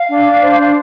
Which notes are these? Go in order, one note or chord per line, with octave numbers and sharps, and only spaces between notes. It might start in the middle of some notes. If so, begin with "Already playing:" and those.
Already playing: F5
D4
D4
C5
D4